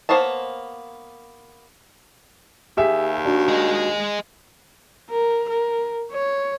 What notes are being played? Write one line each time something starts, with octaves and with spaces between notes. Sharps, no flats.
A#3 B3 C5 C#5 A5
D#2 G4 G#4 E5
D4 F#4
G#4 D#5
A#4
A#4
C#5